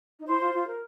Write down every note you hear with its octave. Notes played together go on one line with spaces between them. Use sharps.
D#4
E4 C5
F4
F4
A#4